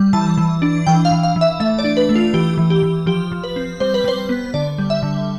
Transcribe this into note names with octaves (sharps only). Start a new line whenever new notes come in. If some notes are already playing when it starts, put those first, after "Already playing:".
Already playing: G3
E3 A5
E3
D4
E3 G5
F5
E3
F5
E3
E5
A3 E5
D5
D4
B4
A3
F4
E3 G4
E3
G4
E3
F3 G4
F3
B4
C4
G3 C5
B4
G3 C5
B3
D3 D5
G3
E5
D3